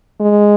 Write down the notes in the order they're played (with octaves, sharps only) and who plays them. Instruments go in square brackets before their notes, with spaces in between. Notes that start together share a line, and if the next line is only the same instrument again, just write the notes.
[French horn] G#3